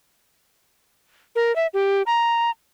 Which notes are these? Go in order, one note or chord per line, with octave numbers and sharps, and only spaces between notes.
A#4
E5
G4
A#5